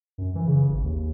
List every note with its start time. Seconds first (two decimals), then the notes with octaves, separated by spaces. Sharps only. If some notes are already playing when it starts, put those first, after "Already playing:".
0.18 F#2
0.35 E3
0.47 C#3
0.69 G#1
0.83 D#2